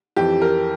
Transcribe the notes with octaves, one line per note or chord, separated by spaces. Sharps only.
F2 E3 G4
A#4